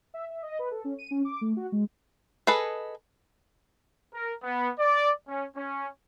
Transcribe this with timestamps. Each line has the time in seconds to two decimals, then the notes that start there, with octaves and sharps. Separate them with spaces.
0.14 E5
0.30 E5
0.42 D#5
0.59 B4
0.71 A4
0.84 C#4
0.99 D#7
1.11 C#4
1.25 D6
1.41 A3
1.57 F#4
1.72 G#3
2.47 G#4 A4 B4 D#5
4.13 A#4
4.42 B3
4.78 D5
5.26 C#4
5.55 C#4